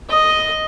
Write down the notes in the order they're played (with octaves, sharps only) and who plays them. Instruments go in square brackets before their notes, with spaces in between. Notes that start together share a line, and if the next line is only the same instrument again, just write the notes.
[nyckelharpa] D#5